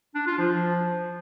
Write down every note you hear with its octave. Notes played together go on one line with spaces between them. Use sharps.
D4
F4
F3